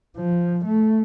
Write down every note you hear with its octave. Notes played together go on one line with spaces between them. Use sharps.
F3
A3